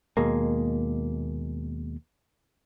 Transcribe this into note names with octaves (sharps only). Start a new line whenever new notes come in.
D#2 B2 G#3 A#3